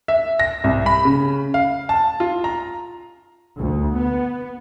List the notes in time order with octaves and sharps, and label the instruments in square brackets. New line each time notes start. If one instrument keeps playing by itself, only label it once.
[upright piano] E5
A#6
C2
B5
C#3
F5
A5
F4
A#5
[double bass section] D2
B3